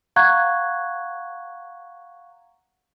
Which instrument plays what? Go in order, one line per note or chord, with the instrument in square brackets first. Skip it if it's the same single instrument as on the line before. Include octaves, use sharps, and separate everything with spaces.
[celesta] F5 F#5 A#5 C#6 F#6 G#6